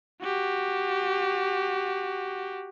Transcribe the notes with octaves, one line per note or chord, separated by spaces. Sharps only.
F#4 G4